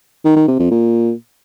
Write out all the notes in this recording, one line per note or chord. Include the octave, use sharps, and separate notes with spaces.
D#3
D#3
C3
F2
A#2